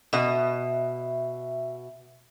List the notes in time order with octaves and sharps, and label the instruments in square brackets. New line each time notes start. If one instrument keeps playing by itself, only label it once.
[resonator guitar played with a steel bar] B2 D#5 [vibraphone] E5